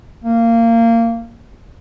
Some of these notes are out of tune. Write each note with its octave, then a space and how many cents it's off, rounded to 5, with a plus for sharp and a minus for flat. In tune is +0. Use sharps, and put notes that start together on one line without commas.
A#3 -20